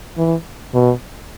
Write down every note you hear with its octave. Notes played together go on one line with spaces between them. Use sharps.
E3
B2